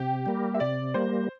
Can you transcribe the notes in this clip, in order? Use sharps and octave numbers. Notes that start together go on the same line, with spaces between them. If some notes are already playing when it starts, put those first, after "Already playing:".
Already playing: C3 G4
G3 A#3
E5
C3 D5
G3 A#3 C5